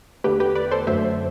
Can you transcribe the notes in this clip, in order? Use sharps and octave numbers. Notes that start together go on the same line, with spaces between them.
E2 D3 A3 G4 B4
G4 B4
B4 D5
A4 C5
F#2 D3 F#3 A3 C5 E5